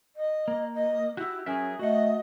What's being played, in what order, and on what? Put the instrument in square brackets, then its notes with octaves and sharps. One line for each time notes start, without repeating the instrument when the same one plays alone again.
[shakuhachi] D#5
[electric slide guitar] A#3
[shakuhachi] D#5
[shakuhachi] E4 [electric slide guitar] F#4 G4
[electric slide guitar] F#3 A#4 E5 [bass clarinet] C#4 [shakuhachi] G#4
[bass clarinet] A3 [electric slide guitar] F#4 F#5 [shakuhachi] D#5